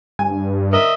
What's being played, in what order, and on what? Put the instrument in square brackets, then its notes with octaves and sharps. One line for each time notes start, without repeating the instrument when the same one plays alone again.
[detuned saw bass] G2 [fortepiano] G#5
[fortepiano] A#4 [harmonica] D#5 E5